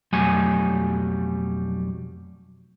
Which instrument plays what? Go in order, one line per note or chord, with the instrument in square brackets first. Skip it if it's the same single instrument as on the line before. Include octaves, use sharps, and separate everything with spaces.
[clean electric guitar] B1 F2 F#3 G3 A3 G#5